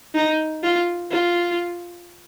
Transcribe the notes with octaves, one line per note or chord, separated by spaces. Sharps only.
D#4
F4
F4